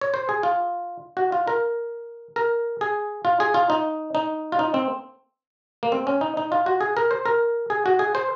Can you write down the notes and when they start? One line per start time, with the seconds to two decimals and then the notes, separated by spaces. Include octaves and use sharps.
0.01 C#5
0.14 C5
0.29 G#4
0.43 F4
1.17 F#4
1.32 F4
1.48 A#4
2.36 A#4
2.81 G#4
3.25 F4
3.40 G#4
3.54 F4
3.70 D#4
4.15 D#4
4.52 F4
4.59 D#4
4.74 C4
5.83 A#3
5.92 C4
6.07 C#4
6.21 D#4
6.37 D#4
6.52 F4
6.66 F#4
6.81 G#4
6.97 A#4
7.11 C5
7.26 A#4
7.70 G#4
7.86 F#4
7.99 G#4
8.15 C5